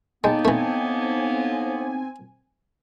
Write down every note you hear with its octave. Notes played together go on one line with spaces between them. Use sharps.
A2 G#3 A#3 B3 D#4 G5 A5
E3 A3 C4 G#5